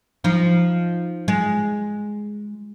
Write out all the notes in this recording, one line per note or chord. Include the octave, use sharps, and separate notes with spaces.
F3 D#4
G#3